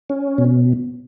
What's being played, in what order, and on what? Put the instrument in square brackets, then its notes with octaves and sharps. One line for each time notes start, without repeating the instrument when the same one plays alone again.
[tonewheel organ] C#4
B2